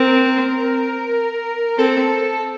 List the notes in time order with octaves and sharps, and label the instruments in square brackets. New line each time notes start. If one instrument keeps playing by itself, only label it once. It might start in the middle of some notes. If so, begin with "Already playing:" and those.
Already playing: [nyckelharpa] C4 [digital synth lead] A#4
[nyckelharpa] C4 [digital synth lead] A4